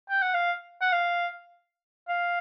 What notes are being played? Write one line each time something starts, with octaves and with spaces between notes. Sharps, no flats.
G5
F#5
F5
F#5
F5
F5